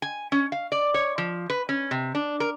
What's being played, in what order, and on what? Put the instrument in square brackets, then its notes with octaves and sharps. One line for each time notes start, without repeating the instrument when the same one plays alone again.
[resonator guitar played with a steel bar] G#5
C#4
F5
D5
C#5
F3
B4
C#4
C3
D4
A#4